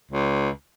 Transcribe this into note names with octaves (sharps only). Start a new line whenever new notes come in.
C#2